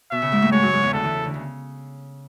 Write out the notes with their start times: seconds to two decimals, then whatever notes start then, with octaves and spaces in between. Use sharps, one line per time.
0.12 B2 E5
0.22 C#3
0.32 G#2 G#3
0.42 A2 A3
0.52 G#2 G#3 C#5
0.62 F#2 F#3
0.73 G#2 G#3
0.83 E2 E3
0.93 D2 D3 A4
1.03 E2 E3
1.14 C#3
1.24 D2 D3
1.34 C#3